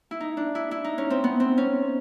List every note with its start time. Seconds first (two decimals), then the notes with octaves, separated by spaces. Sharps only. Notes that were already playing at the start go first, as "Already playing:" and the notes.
0.11 E4
0.20 D#4
0.37 D4
0.55 E4
0.71 E4
0.85 D#4
0.98 C#4
1.10 C4
1.24 B3
1.40 C4
1.58 C#4